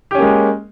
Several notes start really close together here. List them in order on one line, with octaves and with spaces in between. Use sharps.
G4 C#4 A#3 G#3